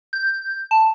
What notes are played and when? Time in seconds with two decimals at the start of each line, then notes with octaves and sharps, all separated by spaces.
0.13 G6
0.71 A5